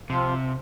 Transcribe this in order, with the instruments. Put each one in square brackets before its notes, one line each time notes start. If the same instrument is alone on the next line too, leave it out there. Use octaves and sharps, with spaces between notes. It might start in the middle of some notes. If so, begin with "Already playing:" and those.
[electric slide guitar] C3 [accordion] F3 C4 F4